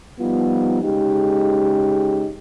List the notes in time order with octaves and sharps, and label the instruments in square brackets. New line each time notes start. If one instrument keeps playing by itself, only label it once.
[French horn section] F3 G3 B3 D#4 F4
C#3 G#3 D#4 G4